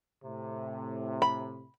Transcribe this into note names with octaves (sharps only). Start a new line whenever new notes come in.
A2 C3
B5